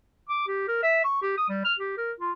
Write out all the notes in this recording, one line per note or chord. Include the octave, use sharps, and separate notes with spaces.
D6
G4
A#4
E5
C#6
G4
D#6
G3
F6
G4
A#4
F4